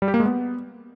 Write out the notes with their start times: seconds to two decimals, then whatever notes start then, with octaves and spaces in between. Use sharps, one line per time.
0.02 G3
0.08 G4
0.14 A#3
0.20 G#3
0.26 B3